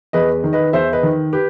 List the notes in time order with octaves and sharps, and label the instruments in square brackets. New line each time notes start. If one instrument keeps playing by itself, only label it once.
[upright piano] E2 B4 D#5
D#3
B4 D#5
E2 C5 E5
B4 D#5
D#3
G4 B4